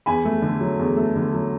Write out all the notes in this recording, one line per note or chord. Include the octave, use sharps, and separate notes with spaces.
E2 G#5 B5
A3
D3
F#3
E2
A3
D3
F#3